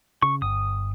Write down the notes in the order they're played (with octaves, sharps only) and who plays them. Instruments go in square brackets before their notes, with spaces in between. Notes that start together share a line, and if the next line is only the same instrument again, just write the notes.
[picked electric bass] C#3 [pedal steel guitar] C#6
[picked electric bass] G1 [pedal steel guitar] D#6